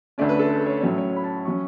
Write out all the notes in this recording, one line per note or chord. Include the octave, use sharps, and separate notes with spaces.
D2 D3 A3 C#4 D5
B4
A4
B4
C#5
A2 F#3 C#4 C#5
C#5
B5
A5
F#3 C#4 C#6